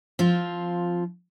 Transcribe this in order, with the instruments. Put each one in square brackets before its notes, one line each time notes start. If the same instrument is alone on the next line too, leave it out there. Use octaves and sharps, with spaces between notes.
[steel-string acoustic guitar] F3 C4 F4